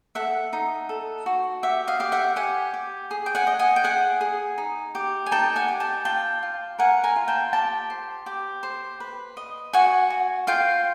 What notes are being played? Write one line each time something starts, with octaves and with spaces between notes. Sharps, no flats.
A4 E5 F#5
D#4
A4
F#4
G4 E5 F#5
D#5 F5
G4 F5
E5 F#5
G4 F#5 G#5
G4
G#4
G5
F#5 G#5
D#5
F#5 G#5
G5
G#4 F#5 G#5
G#4
D#4
G4
G#5
D#4 G5 A5
F#5 G#5
G4
G5 A5
F4 G5 A5
F4
A#4 F#5 G#5
G#5 A#5
F4
G5 A5
G4 G5 A5
C5
G4
C5
B4
D#5
F#4 F#5 G#5
F#4
F4 F5 G5